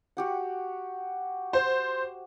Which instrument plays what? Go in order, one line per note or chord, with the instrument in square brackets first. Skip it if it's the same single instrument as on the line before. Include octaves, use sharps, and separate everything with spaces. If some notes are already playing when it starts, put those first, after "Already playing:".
[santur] F#4 G4 F#5
[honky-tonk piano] C5